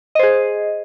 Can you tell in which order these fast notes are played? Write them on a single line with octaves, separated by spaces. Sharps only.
D#5 C5 G#4